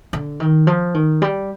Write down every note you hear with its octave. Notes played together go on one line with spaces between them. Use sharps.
D3
D#3
F3
D#3
G3